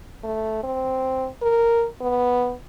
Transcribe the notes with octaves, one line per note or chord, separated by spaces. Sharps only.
A3
C4
A#4
B3